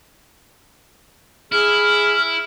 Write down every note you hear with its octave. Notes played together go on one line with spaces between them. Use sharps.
E4 G#4 F6